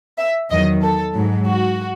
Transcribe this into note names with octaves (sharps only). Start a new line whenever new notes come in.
E5
E2 D#3 F#3 D#5
A4
G#2 F#3
F#4